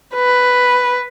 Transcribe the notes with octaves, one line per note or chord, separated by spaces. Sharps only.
B4